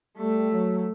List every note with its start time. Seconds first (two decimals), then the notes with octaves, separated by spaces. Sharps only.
0.17 G3 A3
0.51 F#3